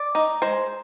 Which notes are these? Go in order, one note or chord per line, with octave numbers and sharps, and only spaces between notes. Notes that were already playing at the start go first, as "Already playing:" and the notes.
Already playing: D5
D#4
G#3 C5